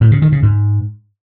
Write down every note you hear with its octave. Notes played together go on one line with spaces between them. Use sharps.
A2
C#3
D#3
C#3
G#2